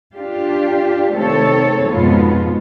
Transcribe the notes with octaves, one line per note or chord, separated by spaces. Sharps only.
D4 F4 G4
C3 D#3 A3 C4 A4 C#5
F2 G#2 B2 G#3 B3 F4